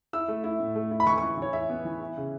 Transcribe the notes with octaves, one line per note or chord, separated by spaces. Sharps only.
E4 E6
A3
E4
A2
A3
E4
B5
E3 C#6
C#6
E3
E3 C#5
E4 E5
B3
E3
E4
C#3